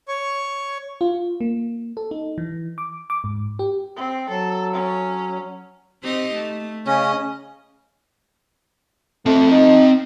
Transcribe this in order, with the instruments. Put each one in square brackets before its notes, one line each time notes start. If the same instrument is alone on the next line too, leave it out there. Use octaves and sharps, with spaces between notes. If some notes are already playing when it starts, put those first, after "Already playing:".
[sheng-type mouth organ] C#5 C#6
[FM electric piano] F4
A#3
A4
D#4
E3
D6
D6
G#2
G4
[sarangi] C4
[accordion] F#3 [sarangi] A4
[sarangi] C#4
[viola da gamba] C4 D#4 G4
A3
[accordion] C#3 C#4 [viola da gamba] D#5
[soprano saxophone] A3 [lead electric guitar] C4 A5
[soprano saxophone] D#4